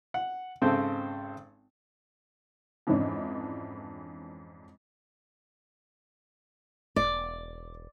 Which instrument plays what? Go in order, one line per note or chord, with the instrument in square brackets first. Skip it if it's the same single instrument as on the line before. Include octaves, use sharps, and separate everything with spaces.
[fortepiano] F#5
G#1 C#3 C4 A4 C5
[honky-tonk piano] F2 G#2 E3 C#4 D4
[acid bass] E1 [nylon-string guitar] D5